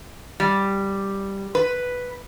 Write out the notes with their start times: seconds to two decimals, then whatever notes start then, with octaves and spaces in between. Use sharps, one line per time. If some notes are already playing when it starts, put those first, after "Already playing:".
0.40 G3
1.55 B4